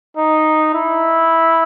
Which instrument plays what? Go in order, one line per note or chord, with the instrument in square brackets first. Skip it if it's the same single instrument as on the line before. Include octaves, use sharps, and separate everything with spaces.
[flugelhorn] D#4
E4